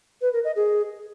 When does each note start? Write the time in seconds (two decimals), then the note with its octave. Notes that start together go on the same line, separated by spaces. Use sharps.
0.21 B4
0.33 A#4
0.44 D#5
0.56 G#4